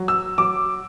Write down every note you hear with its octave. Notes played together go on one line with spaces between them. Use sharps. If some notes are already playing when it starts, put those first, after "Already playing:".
Already playing: F#3
E6
F#3 D6